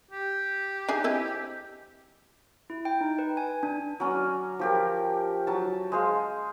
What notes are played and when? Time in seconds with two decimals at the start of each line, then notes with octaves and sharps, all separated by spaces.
0.11 G4
0.88 D4 D#4 G#4
1.04 C4 E4 D#5
2.70 E4
2.85 G5
3.01 D#4
3.19 B4
3.37 G#5
3.63 D4
4.00 F#3 C#4 D5
4.59 F3 G4 A#4
5.47 F#3 A5
5.92 G#3 C5 F5